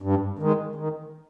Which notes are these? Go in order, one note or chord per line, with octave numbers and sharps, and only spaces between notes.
G2
D#3 G#3
D#3